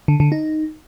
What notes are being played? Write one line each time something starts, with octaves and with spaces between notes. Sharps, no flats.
D3
D3
D#4